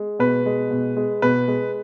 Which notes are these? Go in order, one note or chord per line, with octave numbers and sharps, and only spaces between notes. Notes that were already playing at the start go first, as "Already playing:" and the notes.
Already playing: G#3
B2 B4
G#3
B2
G#3
B2 B4
G#3